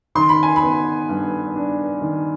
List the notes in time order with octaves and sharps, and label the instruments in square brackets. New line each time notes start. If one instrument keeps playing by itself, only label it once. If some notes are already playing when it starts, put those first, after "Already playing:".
[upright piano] D#3 C6
B5
G#5
B5
B3
G2
D4
D#3